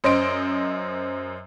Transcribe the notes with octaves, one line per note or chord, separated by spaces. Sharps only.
F#2 C5 D#5 C6 D7